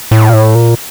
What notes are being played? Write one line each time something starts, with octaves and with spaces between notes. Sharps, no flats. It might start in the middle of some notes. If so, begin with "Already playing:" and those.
A2
A#2
A2
A#2